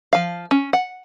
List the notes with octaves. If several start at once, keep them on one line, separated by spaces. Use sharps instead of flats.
F3 F5
C#4
F#5